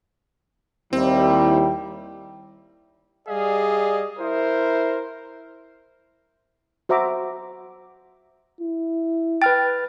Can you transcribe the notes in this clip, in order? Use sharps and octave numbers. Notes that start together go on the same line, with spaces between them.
D#2 G3 C4 E4
G3 G#4 D5 D#5 F5
E4 A#4 C5
F#4 C5 E5 A#5 D6
E4
B4 G5 F6 A6